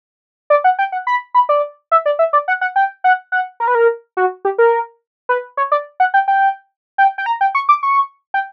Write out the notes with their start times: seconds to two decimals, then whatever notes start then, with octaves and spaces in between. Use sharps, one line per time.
0.50 D5
0.64 F#5
0.79 G5
0.92 F#5
1.07 B5
1.35 B5
1.49 D5
1.92 E5
2.06 D5
2.19 E5
2.33 D5
2.48 F#5
2.61 F#5
2.76 G5
3.04 F#5
3.32 F#5
3.60 A#4
3.68 B4
3.75 A#4
4.17 F#4
4.45 G4
4.58 A#4
5.29 B4
5.57 C#5
5.72 D5
6.00 F#5
6.14 G5
6.28 G5
6.98 G5
7.18 G5
7.26 A#5
7.41 G5
7.55 C#6
7.69 D6
7.83 C#6
8.34 G5